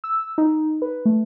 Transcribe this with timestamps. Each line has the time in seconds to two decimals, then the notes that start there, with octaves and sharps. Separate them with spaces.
0.04 E6
0.38 D#4
0.82 B4
1.05 A3